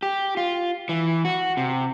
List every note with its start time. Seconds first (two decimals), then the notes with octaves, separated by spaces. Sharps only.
0.03 G4
0.37 F4
0.89 E3
1.25 F#4
1.57 C3